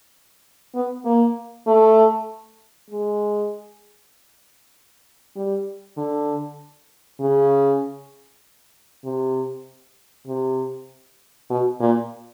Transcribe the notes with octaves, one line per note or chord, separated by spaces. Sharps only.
B3
A#3
A3
G#3
G3
D3
C#3
C3
C3
B2
A#2